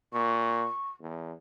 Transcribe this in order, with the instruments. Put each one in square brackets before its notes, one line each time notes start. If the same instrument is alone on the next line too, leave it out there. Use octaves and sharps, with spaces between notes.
[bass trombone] A#2 [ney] C#6
[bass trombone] E2